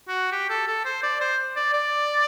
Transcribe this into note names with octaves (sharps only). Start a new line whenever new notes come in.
F#4
G4
A4
A4
C5
D5
C5
D5
D5